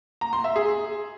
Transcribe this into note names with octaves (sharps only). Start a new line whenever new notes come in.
A#5
C6
E5
G#4